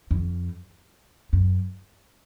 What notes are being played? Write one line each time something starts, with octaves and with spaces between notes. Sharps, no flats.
F2
F#2